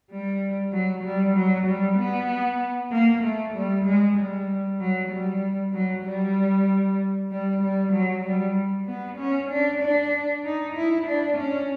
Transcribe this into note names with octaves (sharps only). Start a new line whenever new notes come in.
G3
F#3
G3
F#3
G3
B3
A#3
A3
G3
G#3
G3
F#3
G3
F#3
G3
G3
G3
F#3
G3
B3
C#4
D4
D4
D#4
E4
D4
C#4